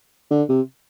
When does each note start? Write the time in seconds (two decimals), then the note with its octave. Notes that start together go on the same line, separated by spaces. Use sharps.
0.31 D3
0.49 C3